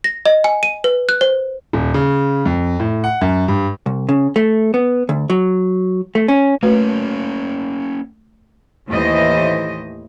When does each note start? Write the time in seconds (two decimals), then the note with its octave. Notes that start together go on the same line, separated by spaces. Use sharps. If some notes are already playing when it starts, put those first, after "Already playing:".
0.04 A#6
0.26 D#5
0.44 G#5
0.63 D#7
0.84 B4
1.09 F#6
1.21 C5
1.73 D#1
1.94 C#3
2.45 F2
2.80 A2
3.04 F#5
3.21 F#2
3.48 G2
3.86 C2
4.09 C#3
4.36 A3
4.74 B3
5.09 D2
5.30 F#3
6.15 A3
6.28 C#4
6.63 A3 A#3 C#4 F#4 B4
8.88 D#2 A2 E3 A3 C5 D#5